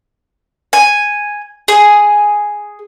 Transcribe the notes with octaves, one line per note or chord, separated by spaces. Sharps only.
G#5
G#4